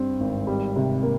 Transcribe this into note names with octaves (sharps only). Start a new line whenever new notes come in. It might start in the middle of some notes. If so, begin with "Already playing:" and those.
Already playing: G2 C4
G#1
G3
C3
A#3